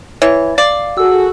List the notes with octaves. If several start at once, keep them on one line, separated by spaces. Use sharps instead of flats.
E3 C#5
D5 F5
F#4 G#4 A4 E6